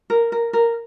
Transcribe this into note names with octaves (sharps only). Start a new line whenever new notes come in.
A#4
A#4
A#4